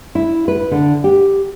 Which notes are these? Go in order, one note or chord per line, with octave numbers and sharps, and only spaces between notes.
E4
B4
D3
G4